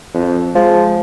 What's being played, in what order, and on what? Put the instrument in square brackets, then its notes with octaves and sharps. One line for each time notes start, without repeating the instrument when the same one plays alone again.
[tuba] F2
[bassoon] F3 [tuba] G#3